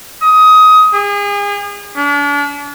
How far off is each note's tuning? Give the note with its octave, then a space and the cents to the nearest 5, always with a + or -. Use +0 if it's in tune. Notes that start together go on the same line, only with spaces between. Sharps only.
D#6 +20
G#4 -35
D4 -40